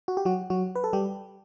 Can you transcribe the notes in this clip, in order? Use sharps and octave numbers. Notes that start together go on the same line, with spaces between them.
F#4
G4
F#3 F#4
F#3 F#4
B4
A4
G3 G4